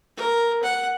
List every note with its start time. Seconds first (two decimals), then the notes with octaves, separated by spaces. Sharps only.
0.17 A#4
0.63 F#5